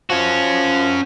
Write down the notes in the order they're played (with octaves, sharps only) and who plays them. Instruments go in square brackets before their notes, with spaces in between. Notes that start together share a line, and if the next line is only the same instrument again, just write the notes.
[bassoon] F3 [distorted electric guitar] C#4 F#4